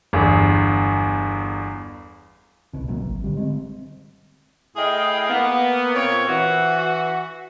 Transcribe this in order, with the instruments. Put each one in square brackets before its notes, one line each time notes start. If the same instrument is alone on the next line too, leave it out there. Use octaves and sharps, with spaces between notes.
[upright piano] G1 E2
[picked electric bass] D1 C2 B2
B1 E3 F#3 A#3
G#1
D3 G3
G#3 C4
[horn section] A2 E4 G#4 D#5 F5 G5
A#3 B3
A#2 C4 C#5
E3 F#4